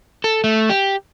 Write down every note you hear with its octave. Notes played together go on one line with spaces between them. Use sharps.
A4
A3
G4